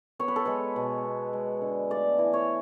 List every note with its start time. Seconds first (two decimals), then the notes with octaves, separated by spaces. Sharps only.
0.19 B3 C#5
0.28 B4
0.36 A4
0.45 G#3 B4
0.76 B2
1.05 B3
1.33 G#3
1.61 D3
1.90 A3 D5
2.18 E3
2.33 C#5